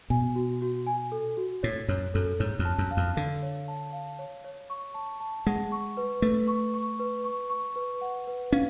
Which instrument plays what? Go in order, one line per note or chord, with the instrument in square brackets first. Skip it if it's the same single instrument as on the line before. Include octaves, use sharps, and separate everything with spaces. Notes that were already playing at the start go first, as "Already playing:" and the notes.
[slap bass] B2 [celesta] G#5
[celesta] F#4
F#4
G#5
A4
F#4
[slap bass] A2 [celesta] C#5
[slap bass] F#2 [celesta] C#5
[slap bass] F#2 [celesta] A4
[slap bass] G#2 [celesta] C#5
[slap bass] F2
[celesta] A5
[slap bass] F#2
[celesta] F5
[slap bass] F2
[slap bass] D3 [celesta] F5
[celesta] C#5
A5
F5
C#5
C#5
C#6
A5
A5
[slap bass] G#3 [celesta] F#5
[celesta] C#6
B4
[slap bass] A3 [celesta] B4
[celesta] C#6
C#6
B4
C#6
C#6
B4
F#5
B4
[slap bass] C#4 [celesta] F5